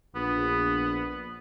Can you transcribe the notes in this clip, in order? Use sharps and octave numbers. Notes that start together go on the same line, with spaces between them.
A#1 B3